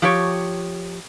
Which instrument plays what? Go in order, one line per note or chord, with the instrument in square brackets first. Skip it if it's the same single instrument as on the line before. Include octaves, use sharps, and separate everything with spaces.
[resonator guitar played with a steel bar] F3 G4 C#5